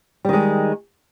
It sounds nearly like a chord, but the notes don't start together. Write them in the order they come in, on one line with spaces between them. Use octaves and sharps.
G3 D#3 G#3